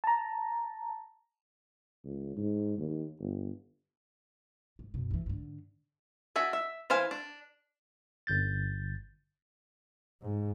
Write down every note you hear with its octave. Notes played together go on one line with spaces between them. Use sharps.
A5 A#5
C#2
G#2
D#2
G1
G#2
F#2 B2
D#3 E3
G#2 D3
D4 F#4 E5 G#5
E5
E3 C5 F5 G#5
D4
G1 G6 A6
G#2